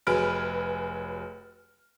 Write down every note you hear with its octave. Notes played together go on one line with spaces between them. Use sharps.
F1 F#3 G#4 B4 F6 D7